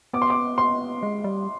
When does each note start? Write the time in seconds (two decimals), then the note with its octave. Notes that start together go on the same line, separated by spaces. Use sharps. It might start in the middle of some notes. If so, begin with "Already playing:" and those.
0.13 B3 D6
0.22 C6
0.30 D6
0.58 C6
1.03 G#3
1.24 G3